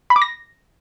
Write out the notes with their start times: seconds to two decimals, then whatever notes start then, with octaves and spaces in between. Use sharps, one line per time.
0.10 B5
0.16 D6
0.22 A#6